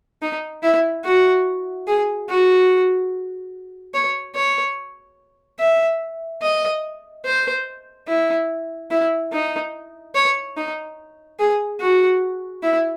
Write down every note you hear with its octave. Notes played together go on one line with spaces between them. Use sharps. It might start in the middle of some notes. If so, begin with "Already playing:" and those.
D#4
E4
F#4
G#4
F#4
C#5
C#5
E5
D#5
C5
E4
E4
D#4
C#5
D#4
G#4
F#4
E4